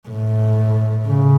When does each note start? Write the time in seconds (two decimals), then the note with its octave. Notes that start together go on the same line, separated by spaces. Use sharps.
0.08 A2
1.07 C#3